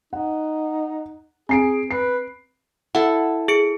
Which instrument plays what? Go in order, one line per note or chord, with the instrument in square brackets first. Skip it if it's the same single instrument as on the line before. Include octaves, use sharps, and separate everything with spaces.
[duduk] D#4 [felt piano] F#5
[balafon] C4 [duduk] G#4 [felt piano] G#5 C7 D7
[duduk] B4 [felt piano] C7
[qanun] E4 A4 [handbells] F#5
[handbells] G#4 C#7 D7